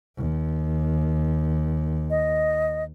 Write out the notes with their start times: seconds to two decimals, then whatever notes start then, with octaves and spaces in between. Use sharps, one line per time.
0.17 D#2
2.10 D#5